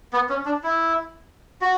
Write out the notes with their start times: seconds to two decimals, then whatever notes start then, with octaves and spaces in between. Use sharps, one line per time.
0.13 B3
0.29 C#4
0.46 D4
0.63 E4
1.61 F#4